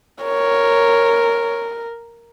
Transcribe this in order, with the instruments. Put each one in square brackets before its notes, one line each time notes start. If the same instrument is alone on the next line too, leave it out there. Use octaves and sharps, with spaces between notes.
[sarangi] A#4 [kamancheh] C#5